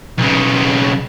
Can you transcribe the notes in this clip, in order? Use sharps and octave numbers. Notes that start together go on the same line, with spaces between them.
B1 C#3